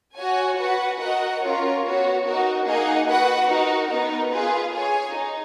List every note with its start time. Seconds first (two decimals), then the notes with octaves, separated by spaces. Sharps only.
0.16 F#4 C#5 G#5
0.58 F#4 B4 F#5
1.00 F#4 A#4 D#5 F#5
1.41 C#4 F4 A#4 C#5
1.82 B3 F#4 C#5
2.23 D#4 F#4 A#4
2.65 A#3 D#4 G#4 D#5 F#5
3.07 F#4 B4 F#5
3.48 D#4 F#4 A#4
3.89 B3 D#4 A#4
4.30 F4 G#4 B4
4.72 G#4 C#5 G#5
5.14 D#4